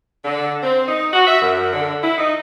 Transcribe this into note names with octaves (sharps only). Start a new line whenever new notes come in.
D3
C4
D#4
F#4
E5
F#2
D3
E4
D#4